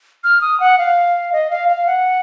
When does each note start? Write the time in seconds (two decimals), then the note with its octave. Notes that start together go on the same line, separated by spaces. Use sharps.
0.24 F6
0.41 D#6
0.60 F#5
0.78 F5
1.32 D#5
1.50 F5
1.69 F5
1.86 F#5